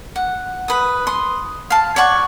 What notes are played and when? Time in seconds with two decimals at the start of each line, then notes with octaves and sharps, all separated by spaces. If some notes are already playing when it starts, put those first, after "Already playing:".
0.16 F#5
0.68 B4 D#6
1.07 C6 D#6
1.70 F5 A5
1.96 C#5 D5 F#5 C#6